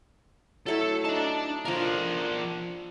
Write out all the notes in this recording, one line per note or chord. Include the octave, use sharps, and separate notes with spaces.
F#3 A3 E4 A4
D4 D#4 A5 C#6
F3 D4 A#4 F5